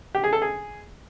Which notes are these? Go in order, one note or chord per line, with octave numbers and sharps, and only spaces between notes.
G4
G#4
A4
G#4